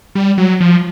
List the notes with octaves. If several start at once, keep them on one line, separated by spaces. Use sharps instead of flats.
G3
F#3
F3